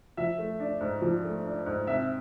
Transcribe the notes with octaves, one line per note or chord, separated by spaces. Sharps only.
F3 E5
A3
D4
G#2
F3
A3
D4
G#2
C3 E5